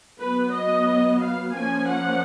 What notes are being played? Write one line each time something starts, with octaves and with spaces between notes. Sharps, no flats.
F#3 B3 B4
D#5
F5
F3 A#3 C#4 G#5
F#5